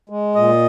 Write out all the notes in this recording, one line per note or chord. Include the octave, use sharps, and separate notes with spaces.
G#3
A#2 D#5